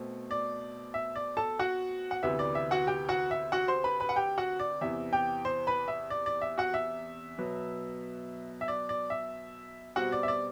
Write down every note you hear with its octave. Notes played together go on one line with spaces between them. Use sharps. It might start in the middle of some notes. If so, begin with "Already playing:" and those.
Already playing: B2 A3 C4
D5
E5
D5
A4 A5
F#4 F#5
F#5
D2 C3 E3 B3 E5
D5
E5
F#4 F#5
G4 G5
F#4 F#5
E5
F#4 F#5
C5 C6
B4 B5
B4 B5
F#5
G4 G5
F#4 F#5
D5
E2 C3 E3 E5
G4 G5
C5 C6
B4 B5
E5
D5
D5
E5
F#4 F#5
E5
B2 F#3 B3
E5
D5
D5
E5
B2 G3 C4 F#4 F#5
D5
E5
D5